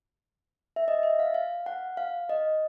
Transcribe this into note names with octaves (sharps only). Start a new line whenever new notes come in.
E5
D#5
E5
F5
F5
F#5
F5
D#5